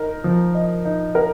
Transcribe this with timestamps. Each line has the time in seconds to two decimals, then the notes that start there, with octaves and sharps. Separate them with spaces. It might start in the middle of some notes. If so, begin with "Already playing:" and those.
Already playing: D#4 A#4
0.24 F3
0.55 D#5
0.85 D#4
1.15 A#4